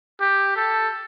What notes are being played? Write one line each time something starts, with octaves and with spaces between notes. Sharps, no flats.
G4
A4